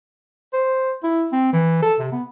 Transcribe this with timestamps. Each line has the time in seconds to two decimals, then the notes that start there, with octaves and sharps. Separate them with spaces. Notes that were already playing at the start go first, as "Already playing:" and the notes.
0.53 C5
1.04 E4
1.32 C4
1.53 E3
1.82 A4
2.00 C3
2.12 B3